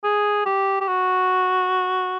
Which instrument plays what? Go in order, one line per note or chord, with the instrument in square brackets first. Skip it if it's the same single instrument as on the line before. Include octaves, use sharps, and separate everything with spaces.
[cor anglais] G#4
G4
G4
F#4